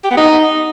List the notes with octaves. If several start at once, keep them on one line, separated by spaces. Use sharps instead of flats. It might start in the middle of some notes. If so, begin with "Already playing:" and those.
G4
B3
D#4